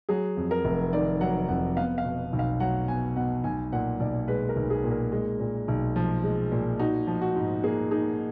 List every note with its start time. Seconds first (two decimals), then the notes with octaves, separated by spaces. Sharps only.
0.09 F#3 G#4
0.37 F2
0.51 A#4
0.65 F1
0.93 D#3 D5
1.21 F#3 F#5
1.49 F2 F#5
1.77 B3 F5
1.98 F5
2.05 B2
2.33 B1
2.39 F5
2.60 F#3 F#5
2.88 B3 G#5
3.16 B2 F#5
3.44 B1 G#5
3.73 A#2 F#5
4.00 B1 D5
4.28 G#3 B4
4.49 A#4
4.56 B1
4.70 G#4
4.84 A#2
4.91 A#4
5.12 G#3
5.40 A#2
5.68 B1
5.96 F3
6.24 G#3
6.52 A#2
6.79 D#4 F#4
7.07 F3
7.22 F#4
7.36 G#2
7.63 A#3 G#4
7.91 D#4 G#4